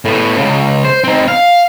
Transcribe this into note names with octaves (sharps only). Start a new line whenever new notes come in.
A2 B3
C#2 C#3
C5
C4 D#4
F5